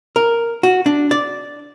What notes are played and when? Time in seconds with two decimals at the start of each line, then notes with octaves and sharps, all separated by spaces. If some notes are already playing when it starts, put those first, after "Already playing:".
0.16 A#4
0.63 F#4
0.86 D4
1.11 D5